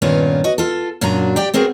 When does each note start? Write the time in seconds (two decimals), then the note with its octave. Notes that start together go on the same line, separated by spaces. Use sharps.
0.02 G2 A#2 D#3 B3 C#4 F4
0.44 F#4 D#5
0.58 F4 A4
1.01 F#2 A#2 F#3 D4 F#4 A#5
1.36 G4 D5 G5
1.54 B3 C4 F#4 G#4 A#4